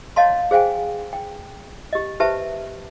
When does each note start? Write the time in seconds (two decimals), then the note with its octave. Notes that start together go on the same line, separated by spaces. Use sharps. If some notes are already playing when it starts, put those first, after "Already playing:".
0.16 C#5 D#5 F5 A5 C6
0.51 G#4 C5 F5 G5 G#5
1.13 G5
1.93 G4 D#5
2.20 G4 B4 C5 E5 A5